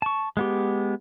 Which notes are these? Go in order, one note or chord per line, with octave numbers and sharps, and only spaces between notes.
A5 C#6
G#3 B3 G4